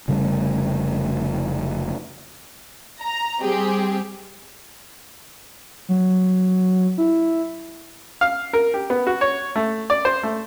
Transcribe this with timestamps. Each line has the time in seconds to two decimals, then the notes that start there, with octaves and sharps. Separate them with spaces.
0.08 F1 C#3 G3 A3
3.01 A#5
3.43 G3 C4 G4 G#4
5.89 F#3
6.98 E4
8.21 F5
8.53 A#4
8.74 G4
8.90 B3
9.07 F#4
9.21 C#5
9.56 A3
9.90 D5
10.05 C5
10.23 A3